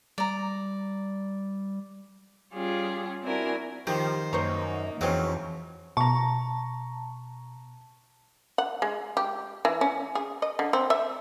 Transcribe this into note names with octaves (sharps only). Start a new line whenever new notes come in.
G3 D5 A#5
G3 C#4 F4 G4 G#4
C4 D4 E4 F#4 A#4 G#5
D#3 F3 G4 C5
F#2 A#3 D#4 C5 C#5 A#5
F2 E3 F#3 G#3 C4 C#4
B2 A5 A#5 C#6
F#5
G#3
G4
E3
C#4
G#4
D#5
D3
C4
E5